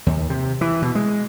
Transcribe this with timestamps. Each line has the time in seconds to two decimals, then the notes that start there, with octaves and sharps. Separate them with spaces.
0.06 D#2
0.30 C3
0.61 E3
0.82 B2
0.95 G#3